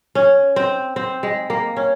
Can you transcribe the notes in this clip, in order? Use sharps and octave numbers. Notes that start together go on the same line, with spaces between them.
C#4
C4
C4
G#3
A#3
C#4